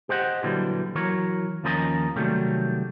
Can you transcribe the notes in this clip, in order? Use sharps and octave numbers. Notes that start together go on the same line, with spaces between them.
G4 C5 D#5 F#5
A#2 D3 E3 F#3 G3
E3 F#3 A#4 C#5
D#2 F3 C#4 A#4 C5 D#5
C3 D#3 F#3 G3 A3